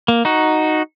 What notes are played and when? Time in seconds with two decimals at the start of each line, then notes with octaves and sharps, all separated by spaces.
0.08 A#3
0.25 D#4 F#4